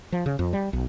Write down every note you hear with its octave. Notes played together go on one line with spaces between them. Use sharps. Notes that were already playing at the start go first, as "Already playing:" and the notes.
F3
C#3
F2
G3
B1